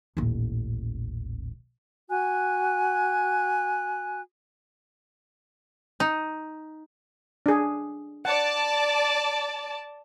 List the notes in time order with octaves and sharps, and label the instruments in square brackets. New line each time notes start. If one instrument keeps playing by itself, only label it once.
[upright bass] D#1 A1
[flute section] F#4 G#5 F#6
[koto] D#4
[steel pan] D4 G#4
[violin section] D5 A5 [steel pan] F#5